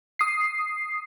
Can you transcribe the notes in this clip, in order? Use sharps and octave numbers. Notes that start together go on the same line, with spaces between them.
D#6 C7